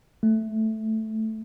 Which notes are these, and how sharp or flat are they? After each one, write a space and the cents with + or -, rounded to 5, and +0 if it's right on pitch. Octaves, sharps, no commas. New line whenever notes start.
A3 -5